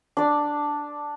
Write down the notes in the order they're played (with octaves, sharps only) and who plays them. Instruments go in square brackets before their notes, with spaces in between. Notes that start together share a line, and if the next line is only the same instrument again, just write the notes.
[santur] D4 D5